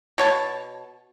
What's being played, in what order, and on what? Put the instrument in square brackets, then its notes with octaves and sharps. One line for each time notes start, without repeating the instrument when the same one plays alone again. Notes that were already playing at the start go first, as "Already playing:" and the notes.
[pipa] B2 C#5 A5